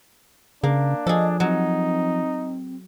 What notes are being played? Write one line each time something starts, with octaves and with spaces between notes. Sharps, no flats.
C#3 A#3 D4
F3 G#4 A4 D#5
F#3 C4 D#4